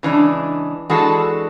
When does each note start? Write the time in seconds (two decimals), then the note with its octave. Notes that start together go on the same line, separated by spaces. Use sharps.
0.03 C#3 E3 G#3 D4
0.90 E3 G#3 D4 F#4 A4